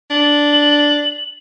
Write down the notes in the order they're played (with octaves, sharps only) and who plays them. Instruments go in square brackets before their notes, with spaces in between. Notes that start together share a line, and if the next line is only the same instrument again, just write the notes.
[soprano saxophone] D4 [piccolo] F#7